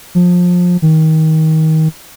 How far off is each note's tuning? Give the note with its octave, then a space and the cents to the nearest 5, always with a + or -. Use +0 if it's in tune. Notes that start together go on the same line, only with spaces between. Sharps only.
F3 +25
D#3 +25